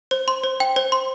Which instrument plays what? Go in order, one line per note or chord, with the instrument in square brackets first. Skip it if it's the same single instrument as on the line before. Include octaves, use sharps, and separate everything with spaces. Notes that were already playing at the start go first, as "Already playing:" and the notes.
[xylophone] C5
C6
C5
G5
C5
C6